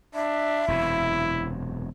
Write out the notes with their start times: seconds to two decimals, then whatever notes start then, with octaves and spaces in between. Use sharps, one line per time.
0.14 D4 E5
0.68 E1 F#2 C3 E4